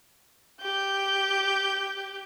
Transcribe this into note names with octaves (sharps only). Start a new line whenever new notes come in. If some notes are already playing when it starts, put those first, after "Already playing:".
G4 G6